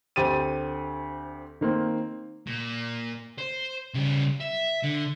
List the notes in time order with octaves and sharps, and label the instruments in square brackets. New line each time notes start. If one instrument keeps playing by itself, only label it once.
[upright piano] D2 C4 G4 A6 D#7
D#3 A#3 C4
[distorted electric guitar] A#2
C5
C#3 G3
E5
D3